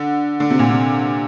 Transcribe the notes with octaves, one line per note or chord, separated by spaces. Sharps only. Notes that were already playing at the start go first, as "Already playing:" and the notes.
Already playing: D3
D3
C3
A#2
C3